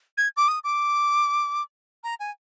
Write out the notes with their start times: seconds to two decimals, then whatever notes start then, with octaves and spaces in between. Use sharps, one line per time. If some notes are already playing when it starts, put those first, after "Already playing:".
0.18 G#6
0.37 D6
0.48 D#6
0.64 D6
2.04 A#5
2.20 G#5